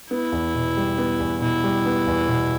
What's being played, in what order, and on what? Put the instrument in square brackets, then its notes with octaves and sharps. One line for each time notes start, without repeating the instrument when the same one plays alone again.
[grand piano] B3 [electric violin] E4
[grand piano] E2
B2
G3
B3
E2
[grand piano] B2 [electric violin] E4
[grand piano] G3
B3
E2
B2